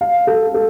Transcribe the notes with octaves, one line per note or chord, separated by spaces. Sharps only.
F5
A4
A4